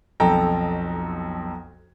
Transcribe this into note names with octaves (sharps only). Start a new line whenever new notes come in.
B1 F2 A4 G5 A#5